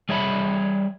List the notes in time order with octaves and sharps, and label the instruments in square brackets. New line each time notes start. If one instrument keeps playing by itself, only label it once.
[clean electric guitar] G3 G#4 C#5 E5 G#5 B5